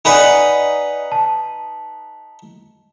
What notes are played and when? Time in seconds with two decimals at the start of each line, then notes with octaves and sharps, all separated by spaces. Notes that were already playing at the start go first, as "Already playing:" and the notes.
0.05 D#4 B4 D5 D#5 F#5 G#5
1.12 A5